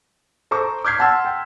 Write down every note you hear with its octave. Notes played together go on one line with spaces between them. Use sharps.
A4 C5 A#5 C#6 D6
D6 F6 G6 G#6 B6 C7
F#5 A5 C6 E6 F6
G5